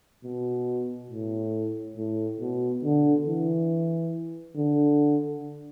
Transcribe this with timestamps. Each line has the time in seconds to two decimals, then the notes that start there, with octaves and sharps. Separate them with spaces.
0.24 B2
1.11 A2
1.97 A2
2.40 B2
2.84 D3
3.26 E3
4.56 D3